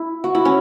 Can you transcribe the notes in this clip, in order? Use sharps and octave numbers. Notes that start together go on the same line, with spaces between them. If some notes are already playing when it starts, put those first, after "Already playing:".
Already playing: E4
F#4
E4
C#4